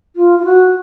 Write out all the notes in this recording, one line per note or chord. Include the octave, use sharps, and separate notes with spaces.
F4
F4
F#4